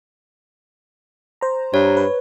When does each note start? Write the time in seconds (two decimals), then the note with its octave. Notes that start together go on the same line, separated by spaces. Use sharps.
1.41 C5 A#5
1.74 G2 C#5
1.97 B4